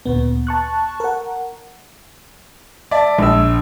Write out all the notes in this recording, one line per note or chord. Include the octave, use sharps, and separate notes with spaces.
D2 A#2 B3
A5 C#6 F#6
A#4 F#5
D5 E5 A5
A#1 E6